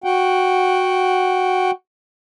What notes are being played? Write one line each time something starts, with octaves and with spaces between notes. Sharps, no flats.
F#4 F#5 G5